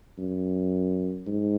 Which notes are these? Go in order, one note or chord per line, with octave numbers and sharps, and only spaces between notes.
F#2
G#2